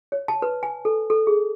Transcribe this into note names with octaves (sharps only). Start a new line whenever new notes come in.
C#5
A5
B4
G#5
A4
A4
G#4